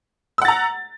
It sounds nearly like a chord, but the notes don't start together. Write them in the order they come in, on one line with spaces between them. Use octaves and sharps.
E6 F#5 A6 A#5